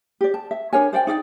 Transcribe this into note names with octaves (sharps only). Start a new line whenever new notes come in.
G4 D5
A5
E5
D4 A#4 C#5 G#5
C5 D5 F#5 G5
D#4 D5 F5 G5